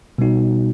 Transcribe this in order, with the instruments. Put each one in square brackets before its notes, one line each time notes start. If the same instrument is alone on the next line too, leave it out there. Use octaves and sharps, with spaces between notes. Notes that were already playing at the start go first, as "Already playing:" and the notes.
[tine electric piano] B2 G3 B3 D#4 F#4